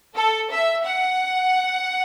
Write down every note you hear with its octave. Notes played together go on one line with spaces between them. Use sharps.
A4
E5
F#5